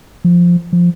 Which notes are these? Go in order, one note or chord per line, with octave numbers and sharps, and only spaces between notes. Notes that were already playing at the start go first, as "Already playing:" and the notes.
F3
F3